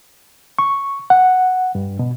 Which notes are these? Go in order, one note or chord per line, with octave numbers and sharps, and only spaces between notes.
C#6
F#5
G2
B2